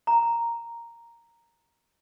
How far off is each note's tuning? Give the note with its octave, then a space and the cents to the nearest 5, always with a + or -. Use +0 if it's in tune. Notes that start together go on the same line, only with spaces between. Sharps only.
A#5 +0